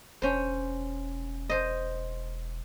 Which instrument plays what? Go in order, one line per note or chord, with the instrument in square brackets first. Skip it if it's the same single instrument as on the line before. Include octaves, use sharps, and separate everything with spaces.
[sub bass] E1 [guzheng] C#4 C5
[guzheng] C5 D#5